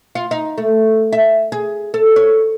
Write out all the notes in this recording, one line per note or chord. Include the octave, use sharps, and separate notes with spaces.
F4
D#4
A3
E5
G#4
A4
C#5